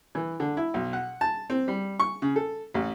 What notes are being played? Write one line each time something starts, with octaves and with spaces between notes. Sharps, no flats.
E3
D3
E4
B1
F#5
A5
C4
G3
C#6
C#3
A4
A1